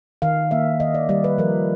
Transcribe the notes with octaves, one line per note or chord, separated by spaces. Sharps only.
D#3 F5
A#3 E5
D#3 D#5
D5
G3 D5
B4
F3 A#4